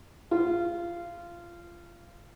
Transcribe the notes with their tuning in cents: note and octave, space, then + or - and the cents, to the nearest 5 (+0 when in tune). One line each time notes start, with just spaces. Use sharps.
F4 -20